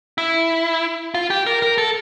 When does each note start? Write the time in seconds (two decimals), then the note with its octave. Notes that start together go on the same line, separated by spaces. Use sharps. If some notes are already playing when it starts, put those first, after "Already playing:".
0.18 E4
1.14 F4
1.30 G4
1.46 A#4
1.62 A#4
1.78 A4